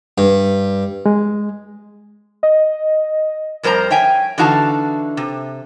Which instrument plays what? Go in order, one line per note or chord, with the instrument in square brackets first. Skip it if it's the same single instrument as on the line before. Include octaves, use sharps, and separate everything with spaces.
[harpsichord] G2
[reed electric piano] G#3
[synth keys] D#5
[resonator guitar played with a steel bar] F2 G3 A#4 C5 A#5
C#5 E5 G5 G#5
D3 E3 D#4 F#4 F5 A5
C3